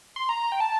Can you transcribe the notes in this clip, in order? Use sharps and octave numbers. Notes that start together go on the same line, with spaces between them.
C6
A#5
G5
A5